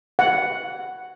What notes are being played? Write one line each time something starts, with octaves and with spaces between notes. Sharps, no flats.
F#5